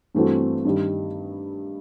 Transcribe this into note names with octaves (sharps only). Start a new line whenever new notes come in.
G2 E3 A3 C4 F#4
G2 D#3 G3